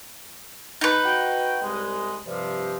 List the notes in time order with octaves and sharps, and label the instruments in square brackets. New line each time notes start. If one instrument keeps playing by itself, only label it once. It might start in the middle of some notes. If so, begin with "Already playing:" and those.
[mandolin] D#4 B4
[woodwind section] F#4 G5
C2 G#3
G2 C3 F3